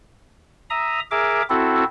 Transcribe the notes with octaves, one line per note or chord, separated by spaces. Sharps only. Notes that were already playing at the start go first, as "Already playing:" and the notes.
E5 A#5 D#6
G#4 A#4 E5 D6
C4 E4 F#4 A4